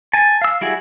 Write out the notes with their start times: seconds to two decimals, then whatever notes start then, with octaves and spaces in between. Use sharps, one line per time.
0.14 G#5 A5
0.42 F5 E6
0.61 G3 E4 F#4 G#4